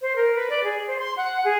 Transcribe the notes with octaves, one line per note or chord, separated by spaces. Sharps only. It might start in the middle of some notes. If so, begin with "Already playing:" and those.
C5
A#4
B4
D5
G#4
C5
C6
F#5
G#4